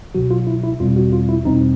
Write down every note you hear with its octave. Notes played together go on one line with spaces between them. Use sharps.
C#2 B2 F#3 F#4
F4
E4
E4
E2 B2 G3 C4 F4
F#4
F4
E4
E2 B2 G3 C4 D#4